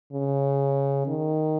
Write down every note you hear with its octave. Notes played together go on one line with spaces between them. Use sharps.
C#3
D#3